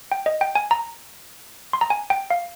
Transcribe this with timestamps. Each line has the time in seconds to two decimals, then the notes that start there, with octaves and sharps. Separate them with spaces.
0.12 G5
0.26 D#5
0.41 G5
0.55 G#5
0.71 A#5
1.73 C6
1.81 A#5
1.90 G#5
2.10 G5
2.30 F5